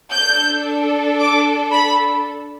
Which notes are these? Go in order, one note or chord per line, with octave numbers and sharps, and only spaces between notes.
D4 A4 G6
D6
B5